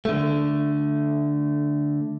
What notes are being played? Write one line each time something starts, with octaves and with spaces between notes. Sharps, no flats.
D3 A3